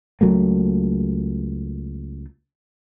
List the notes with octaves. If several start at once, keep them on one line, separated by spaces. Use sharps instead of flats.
C#2 F#3 A3 A#3